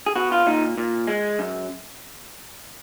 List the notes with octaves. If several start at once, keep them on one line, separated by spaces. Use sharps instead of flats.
G#4
B3 F#4
F4
A#2 D#4
A#2
G#3
F#2